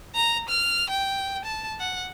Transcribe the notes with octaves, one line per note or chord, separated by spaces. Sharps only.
A#5
F6
G5
A5
F#5